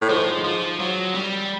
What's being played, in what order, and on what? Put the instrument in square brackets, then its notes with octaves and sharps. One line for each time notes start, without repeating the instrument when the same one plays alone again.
[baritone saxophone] A2
[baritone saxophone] G#2 [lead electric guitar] F3
[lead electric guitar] F3
F#3
G3